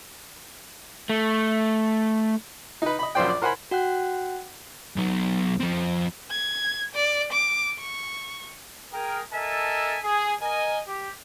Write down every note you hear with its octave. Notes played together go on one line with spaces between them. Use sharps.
A3
D#4 B4
D#5 B5
A#1 F#2 F4 C5 D5 G5
D5
A#4 C5 F#5 G#5 B5
F#4 F#5 G5 F#6
B1 F#3
F2 C4
G#6
D5
D6
C#6
G#4 A#4 G5
A4 A#4 D#5 E5 G#5 A5
G#4
A#4 D#5 G#5
G4